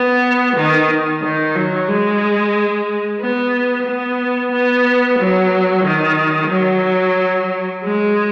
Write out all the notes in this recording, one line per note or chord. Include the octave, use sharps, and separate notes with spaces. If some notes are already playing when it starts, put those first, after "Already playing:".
Already playing: B3
D#3
D#3
F#3
G#3
B3
B3
B3
F#3
D#3
F#3
G#3